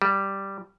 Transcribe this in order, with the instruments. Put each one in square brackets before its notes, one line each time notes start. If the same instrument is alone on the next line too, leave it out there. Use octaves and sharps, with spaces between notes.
[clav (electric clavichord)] G3